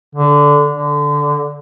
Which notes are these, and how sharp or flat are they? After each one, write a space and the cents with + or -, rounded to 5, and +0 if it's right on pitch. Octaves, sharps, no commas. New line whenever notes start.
D3 -10
D3 -10